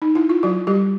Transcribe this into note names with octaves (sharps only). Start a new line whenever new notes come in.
D#4
E4
F4
F#3 F#4
G3 G4